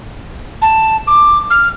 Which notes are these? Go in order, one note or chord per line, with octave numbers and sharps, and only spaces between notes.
A5
D6
F6